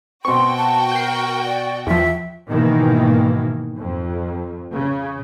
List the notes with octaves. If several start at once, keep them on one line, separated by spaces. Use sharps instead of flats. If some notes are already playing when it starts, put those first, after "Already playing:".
B2 C4 F#4 G5 C6 C#6
A5
A#4 G6 C7
D5
E2 F3 E5
G#2 B2 D#3 E3 A#3
F2
C#3